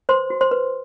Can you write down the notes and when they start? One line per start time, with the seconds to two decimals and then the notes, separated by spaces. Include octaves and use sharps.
0.09 B4 C5 C6
0.30 F#4
0.41 C5 C6
0.51 B4